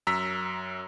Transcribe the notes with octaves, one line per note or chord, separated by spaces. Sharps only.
F#2 A#5 E6 B6